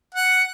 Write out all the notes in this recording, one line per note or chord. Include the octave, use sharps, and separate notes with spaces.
F#5